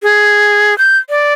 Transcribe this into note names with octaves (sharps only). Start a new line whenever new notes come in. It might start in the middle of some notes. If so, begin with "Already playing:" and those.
G#4
G6
D5